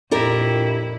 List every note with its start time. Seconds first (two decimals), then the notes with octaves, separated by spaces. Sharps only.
0.11 F2 A#2 D4 E4 G4 A#4